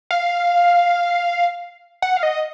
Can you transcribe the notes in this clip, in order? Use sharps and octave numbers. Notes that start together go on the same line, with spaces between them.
F5
F#5
F5
D#5